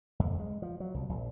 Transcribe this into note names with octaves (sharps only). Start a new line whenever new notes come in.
F2
G#3
F3
F#3
C2
A#1